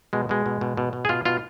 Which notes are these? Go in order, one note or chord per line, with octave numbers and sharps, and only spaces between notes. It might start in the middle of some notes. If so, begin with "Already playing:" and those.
B2 G#3
B2 G#3
B2
B2
B2
B2
G#4
B2 F4
B2 F4